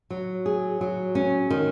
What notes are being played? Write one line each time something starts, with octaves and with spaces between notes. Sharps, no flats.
F#3
G#4
F#3
C#4
D#3